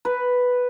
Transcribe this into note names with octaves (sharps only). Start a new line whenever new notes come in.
B4